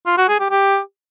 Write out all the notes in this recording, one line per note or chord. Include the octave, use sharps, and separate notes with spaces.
F4
F#4
G#4
G4
G4